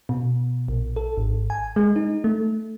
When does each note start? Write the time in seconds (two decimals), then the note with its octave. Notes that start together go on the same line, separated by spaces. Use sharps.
0.09 B2
0.68 A#1
0.96 A4
1.17 G#1
1.50 G#5
1.76 G#3
1.96 D#4
2.24 A3